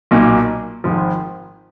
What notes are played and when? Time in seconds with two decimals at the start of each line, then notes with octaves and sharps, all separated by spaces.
0.11 B1 A#2 F#3 A#3 D#4
0.84 G#1 G#2 F3